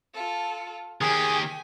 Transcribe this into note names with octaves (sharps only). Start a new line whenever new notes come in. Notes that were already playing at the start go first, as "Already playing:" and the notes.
F4 A4
D#3 G4 G#4 G5 G#5